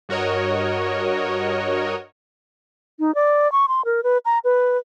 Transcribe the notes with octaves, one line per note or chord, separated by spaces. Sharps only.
G2 F#4 A#4 C#5 D#5
D#4
D5
C#6
C6
A#4
B4
A#5
B4